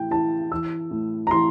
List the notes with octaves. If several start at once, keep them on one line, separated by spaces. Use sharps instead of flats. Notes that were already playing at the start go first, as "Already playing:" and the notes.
Already playing: A2 E3 G5
E3 A5
E3 E6
A2
A#5
E3 C6